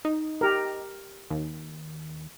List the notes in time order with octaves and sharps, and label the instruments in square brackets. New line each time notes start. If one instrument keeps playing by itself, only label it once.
[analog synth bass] D#4
[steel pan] G4 A#4
[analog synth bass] D#2